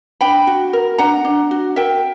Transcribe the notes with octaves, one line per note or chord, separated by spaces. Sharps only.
D4 G5 B5
F#4
A#4
D4 F#5 A#5
D4
F#4
A#4 E5 G5